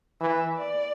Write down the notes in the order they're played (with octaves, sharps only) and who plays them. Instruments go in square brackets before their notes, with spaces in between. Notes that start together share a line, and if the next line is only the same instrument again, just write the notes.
[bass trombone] E3 [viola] E5
[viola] D5